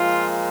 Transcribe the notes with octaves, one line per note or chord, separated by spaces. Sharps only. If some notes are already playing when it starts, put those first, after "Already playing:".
Already playing: A#2 F3 G#3 F4